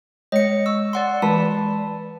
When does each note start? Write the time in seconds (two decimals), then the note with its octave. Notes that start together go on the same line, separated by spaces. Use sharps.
0.32 G#3 C#5 D#5 C#7
0.66 C#6 E6
0.93 D5 F#5 C6
1.22 E3 G#3 B4 A5